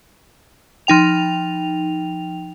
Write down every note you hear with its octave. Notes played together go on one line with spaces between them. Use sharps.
F3 D#4 G5 F7